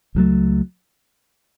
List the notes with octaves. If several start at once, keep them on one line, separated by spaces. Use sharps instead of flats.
C#2 C#3 F#3 A3